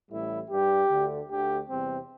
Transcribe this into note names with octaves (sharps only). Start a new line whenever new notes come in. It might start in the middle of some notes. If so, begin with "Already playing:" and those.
A1 A2 G3 E4
G2 G3 G4
D2 D3 A3
D2 D3 A3 G4
E2 C3 G3 C4